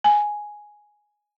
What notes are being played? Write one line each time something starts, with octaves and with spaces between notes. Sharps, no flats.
G#5